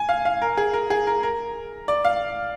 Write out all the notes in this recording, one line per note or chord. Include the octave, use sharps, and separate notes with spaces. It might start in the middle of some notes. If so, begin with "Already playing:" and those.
Already playing: G#5
F5
F5
A#4
G#4
A#4
G#4
A#4
A#4
D5
F5